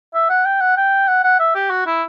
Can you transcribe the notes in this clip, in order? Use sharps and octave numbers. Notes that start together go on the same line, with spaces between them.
E5
F#5
G5
F#5
G5
F#5
F#5
E5
G4
F#4
E4